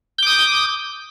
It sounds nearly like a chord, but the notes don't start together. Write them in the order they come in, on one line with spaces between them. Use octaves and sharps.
G6 D6 D#6